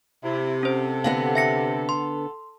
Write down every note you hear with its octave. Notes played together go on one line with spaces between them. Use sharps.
C3 E4
C#4 A4 C5
D3 B3 F5 F#5
E5 A#6 C#7
C6